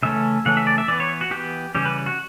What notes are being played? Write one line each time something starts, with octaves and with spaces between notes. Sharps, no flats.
C#3 E3 A3 C#4 E5
C#3 E3 A3 C#4 F#5
E5
D5
E5
E3 B3 D5
C#5
F#4
E3 B3 G4
C#3 E3 G3 C#4 G4
B4
F#4